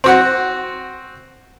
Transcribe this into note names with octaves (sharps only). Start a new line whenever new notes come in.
C4 F#4 F#5